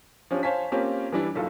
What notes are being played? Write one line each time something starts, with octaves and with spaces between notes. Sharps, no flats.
F3 C#4 D4 G4
C5 C#5 F5 G#5 A5 B6
A#3 C4 C#4 F4 G4
E3 G3 D4 E4
F#1 B1 F4 A4